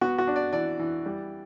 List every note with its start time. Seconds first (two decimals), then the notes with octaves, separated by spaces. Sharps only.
0.01 B3 F#4
0.18 F#4
0.27 D4
0.36 D5
0.53 E3 D5
0.79 E3
1.06 G3